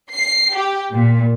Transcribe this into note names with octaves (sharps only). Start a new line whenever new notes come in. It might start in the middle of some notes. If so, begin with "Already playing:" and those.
C7
G4
A#2